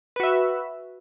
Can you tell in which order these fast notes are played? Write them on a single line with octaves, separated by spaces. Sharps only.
B4 F#4 E5